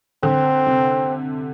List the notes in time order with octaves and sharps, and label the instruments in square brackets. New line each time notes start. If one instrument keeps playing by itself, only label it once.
[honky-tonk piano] D3 [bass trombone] C4
[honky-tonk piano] C3